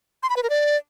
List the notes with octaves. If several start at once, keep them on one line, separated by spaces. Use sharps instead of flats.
C6
B5
B4
A#4
D5